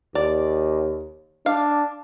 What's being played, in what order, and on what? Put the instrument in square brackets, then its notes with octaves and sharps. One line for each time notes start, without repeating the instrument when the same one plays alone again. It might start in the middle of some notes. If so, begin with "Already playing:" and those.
[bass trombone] D#2 [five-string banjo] D5
[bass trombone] D4 [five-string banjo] F5